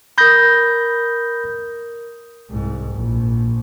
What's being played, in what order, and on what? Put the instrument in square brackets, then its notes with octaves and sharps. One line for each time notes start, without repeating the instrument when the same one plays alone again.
[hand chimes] A#4 D#6 G#6 [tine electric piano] B5 G6 A#6
[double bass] C2 G#2
A#1